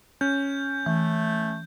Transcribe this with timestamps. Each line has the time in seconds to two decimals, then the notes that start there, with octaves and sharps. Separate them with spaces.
0.21 C#4 G6
0.86 E3 A3